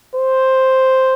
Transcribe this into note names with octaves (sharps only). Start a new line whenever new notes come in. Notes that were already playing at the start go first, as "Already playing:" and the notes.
C5